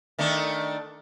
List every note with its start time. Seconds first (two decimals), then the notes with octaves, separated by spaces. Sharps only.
0.19 D#3 A3 D4